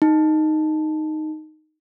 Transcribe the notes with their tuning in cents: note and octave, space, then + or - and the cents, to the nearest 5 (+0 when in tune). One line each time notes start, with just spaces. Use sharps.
D#4 -5